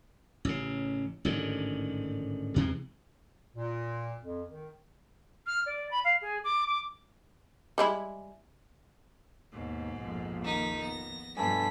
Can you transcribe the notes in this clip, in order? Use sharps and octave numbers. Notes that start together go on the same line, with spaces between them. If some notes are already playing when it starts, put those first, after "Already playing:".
A1 C#3
A1 G#2 D3 D#3
E2 C3 E3 G#3
A#2
F2
D#3
F6
D5
B5
F5
G#4
D6
D6
G3 G#3 E4
D#2 G#2 B2
A#1 F2
D#3 A#3 D#4 B6
B3 A#6
G2 B2 F3 A3 B3 D4 G#5 B6